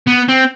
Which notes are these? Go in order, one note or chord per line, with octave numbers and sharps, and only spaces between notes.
B3
C4